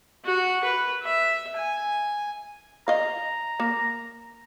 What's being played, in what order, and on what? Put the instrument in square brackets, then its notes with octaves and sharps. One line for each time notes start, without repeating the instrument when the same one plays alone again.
[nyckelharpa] F#4
B4
E5
G#5
[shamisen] D#5 F5 [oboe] A#5
[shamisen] A#3